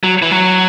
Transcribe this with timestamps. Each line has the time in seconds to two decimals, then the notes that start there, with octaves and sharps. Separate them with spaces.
0.04 F#3
0.22 E3
0.31 F#3